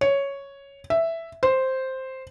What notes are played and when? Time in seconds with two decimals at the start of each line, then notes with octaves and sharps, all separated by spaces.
0.01 C#5
0.90 E5
1.43 C5